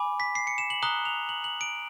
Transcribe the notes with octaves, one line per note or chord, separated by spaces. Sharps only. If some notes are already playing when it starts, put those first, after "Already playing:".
Already playing: G#5 B5 D6
B6
C7
C#7
E7
F#7
A#5 D#6 F#6 G7
F7
F#7
F#7
D7